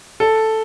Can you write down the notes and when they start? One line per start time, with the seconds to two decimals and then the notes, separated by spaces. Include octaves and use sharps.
0.20 A4